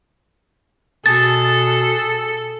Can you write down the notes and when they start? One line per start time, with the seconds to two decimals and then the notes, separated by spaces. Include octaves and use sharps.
1.06 B2 G#4 A4 A5 A6